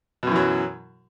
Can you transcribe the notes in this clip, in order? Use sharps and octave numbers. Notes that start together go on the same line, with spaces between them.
F#2 B2 E3 F#3